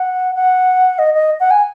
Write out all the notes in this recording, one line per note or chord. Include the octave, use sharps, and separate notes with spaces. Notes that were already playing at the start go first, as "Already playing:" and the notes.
Already playing: F#5
F#5
D#5
D#5
F#5
G#5